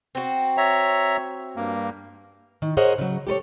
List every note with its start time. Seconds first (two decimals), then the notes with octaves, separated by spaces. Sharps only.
0.15 C4 F#4
0.57 C#5 E5 A#5
1.56 G2 A#3
2.62 D#3
2.77 G#4 A#4 C5 C#5 D#5 F#5
2.98 C#3 F#3
3.27 G4 A4 B4 C#5